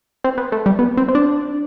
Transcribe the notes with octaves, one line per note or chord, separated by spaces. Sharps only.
C4
B3
A3
G3
B3
C4
C4
D4